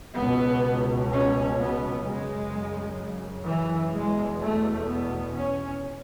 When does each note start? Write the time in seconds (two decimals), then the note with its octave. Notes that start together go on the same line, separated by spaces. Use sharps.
0.18 C#2 B2 B3
1.13 C#4
1.60 B3
2.06 F#2 C#3 G#3
3.47 E3
3.94 E2 B2 G#3
4.42 A3
4.88 B3
5.35 C#4